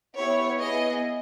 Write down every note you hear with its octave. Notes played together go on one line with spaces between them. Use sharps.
B3 E4 G4 C#5
B3 E4 G#4 D#5